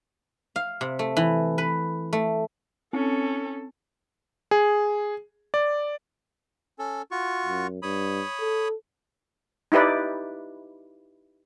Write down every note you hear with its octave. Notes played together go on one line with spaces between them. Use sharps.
F5
C3
A3
E3
B4
A3
C4 C#4 A4
G#4
D5
C#4 A4
F4 F#4 C#6
F#2
G2 C#5 B5 D#6
A4
D#4 E4 G4 B4 D5